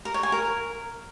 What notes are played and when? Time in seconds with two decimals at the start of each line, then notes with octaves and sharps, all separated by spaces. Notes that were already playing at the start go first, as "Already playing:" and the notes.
0.05 A#4
0.14 C#5
0.23 G#5
0.32 A#4